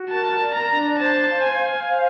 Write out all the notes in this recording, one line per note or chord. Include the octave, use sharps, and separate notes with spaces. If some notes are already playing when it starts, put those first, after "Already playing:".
Already playing: F#4
A#4 A5
D5
A#5
D4
C5 A5
F5
G#5
F5
C5